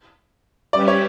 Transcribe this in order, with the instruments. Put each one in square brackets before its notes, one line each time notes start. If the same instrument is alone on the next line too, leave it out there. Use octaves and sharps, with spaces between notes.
[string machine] G3 C#4 G4 B4 E5 [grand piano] D5
[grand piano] C#5